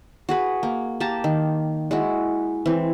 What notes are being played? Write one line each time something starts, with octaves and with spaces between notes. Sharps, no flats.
F#4 G#4 B4
A#3
A#3 G4 A5 A#5
D#3
G#3 E4 F#4
E3 C4